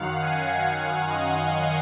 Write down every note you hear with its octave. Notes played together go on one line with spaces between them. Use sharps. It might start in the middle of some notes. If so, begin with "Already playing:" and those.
Already playing: F#2 D#3 F5 F#5
G#5
F5
D#5
D#5